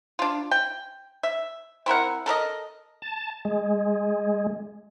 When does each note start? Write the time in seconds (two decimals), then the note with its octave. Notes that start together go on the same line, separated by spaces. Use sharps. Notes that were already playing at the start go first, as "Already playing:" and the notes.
0.19 D4 F4
0.51 G5
1.23 E5
1.86 C4 E4 A#4 F#5
2.26 A4 A#4 D5 D#5
3.02 A5
3.45 G#3